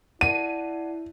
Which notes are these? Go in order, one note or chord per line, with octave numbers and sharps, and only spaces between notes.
E4 D5 F#5 A5 D#7